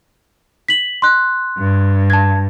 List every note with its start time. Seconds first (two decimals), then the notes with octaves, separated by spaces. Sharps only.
0.68 B6 F#7
1.02 C6 F#6
1.58 G2
2.10 A5 G#6